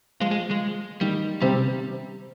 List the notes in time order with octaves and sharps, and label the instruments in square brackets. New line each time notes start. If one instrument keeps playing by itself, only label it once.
[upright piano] F3 F4 [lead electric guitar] G#3
[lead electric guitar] G#3
G#3
[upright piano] D#3 D#4 [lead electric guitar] G3
[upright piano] C3 C4 [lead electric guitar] G3